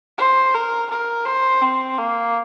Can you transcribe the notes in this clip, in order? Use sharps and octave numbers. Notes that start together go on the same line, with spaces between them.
C5
A#4
A#4
C5
C4
A#3